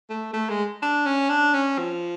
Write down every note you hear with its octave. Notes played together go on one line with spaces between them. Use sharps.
A3
A3
G#3
D4
C#4
D4
C#4
F3